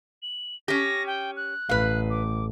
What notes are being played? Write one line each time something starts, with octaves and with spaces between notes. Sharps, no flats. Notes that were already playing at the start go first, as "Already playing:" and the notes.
F#7
C#4 G4 A#6
G5
F#6
A1 B4 F5
D6